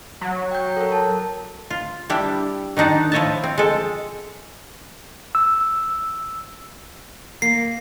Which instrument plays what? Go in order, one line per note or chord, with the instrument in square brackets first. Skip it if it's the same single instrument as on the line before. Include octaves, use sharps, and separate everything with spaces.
[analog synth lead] F#3
[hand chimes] G5 G6
A4 A#4
A5
[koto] F4
G3 D4 E4 G4
D#3 D4 D#4 F#5 A5
F3 E4 C#5 D#5 E5 A5
C4
G#3 A4
[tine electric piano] E6
[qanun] A#3 [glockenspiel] C7